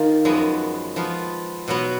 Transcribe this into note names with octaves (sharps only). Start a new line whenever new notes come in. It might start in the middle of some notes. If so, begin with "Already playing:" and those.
Already playing: D#3 A#3 F4
F#2 F3 G#3 B3
F3 B3 F4
B2 F#3 B3